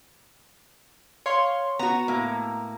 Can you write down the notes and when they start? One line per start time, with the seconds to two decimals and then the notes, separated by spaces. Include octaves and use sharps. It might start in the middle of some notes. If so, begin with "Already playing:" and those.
1.26 C#5 F5 C6
1.79 B3 F#4 A#5
2.08 A2 A#3